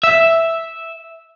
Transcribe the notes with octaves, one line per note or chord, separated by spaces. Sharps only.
E5